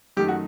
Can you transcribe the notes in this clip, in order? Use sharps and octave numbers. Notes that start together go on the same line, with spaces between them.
F#2 D#3 A3 D#4 G4
F#4